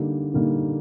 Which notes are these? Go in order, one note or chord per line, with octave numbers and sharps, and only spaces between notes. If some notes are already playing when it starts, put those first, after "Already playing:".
Already playing: D3 G3 A#3 D#4
D3 G3 A#3 D#4